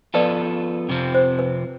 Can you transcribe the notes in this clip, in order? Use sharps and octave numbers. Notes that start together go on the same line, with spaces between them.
F3 B3 F4 A4 B4 D5
F2 C3 F3 C4
C5
B4